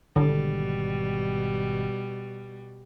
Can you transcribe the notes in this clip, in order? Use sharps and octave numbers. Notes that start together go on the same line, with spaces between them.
G#1 B2 D3 G3